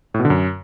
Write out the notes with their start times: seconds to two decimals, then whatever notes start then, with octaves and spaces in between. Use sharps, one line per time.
0.14 A2
0.20 B2
0.25 D3
0.30 F#2